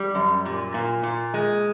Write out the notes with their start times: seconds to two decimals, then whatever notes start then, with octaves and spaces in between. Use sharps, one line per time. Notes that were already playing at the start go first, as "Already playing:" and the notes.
Already playing: G3
0.15 F#2
0.46 A#2
0.74 A#2
1.03 A#2
1.34 G#3